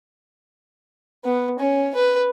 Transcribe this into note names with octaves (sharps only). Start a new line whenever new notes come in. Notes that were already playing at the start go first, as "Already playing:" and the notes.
B3
C#4
B4